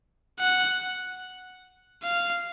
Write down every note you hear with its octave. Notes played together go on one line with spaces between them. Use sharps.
F#5
F5